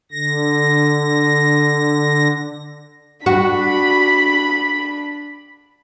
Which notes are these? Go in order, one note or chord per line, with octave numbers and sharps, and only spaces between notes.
D3 A#6
D4 F#4 B5